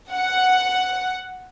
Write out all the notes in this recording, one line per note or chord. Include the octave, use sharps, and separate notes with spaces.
F#5